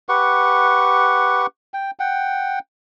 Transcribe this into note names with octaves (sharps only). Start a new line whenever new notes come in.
G4 B4 F#5 C#6
G5
F#5 G5